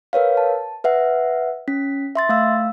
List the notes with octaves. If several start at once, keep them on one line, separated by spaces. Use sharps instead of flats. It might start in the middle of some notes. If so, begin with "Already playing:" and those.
A#4 B4 C#5 F5
A5
B4 E5 F#5
C#4 B6
E5 C6 A6
A3 F5 E6